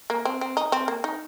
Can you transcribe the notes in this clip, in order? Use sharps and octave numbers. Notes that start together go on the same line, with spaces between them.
A#3
C4
C4
D#4
C4
A#3
D#4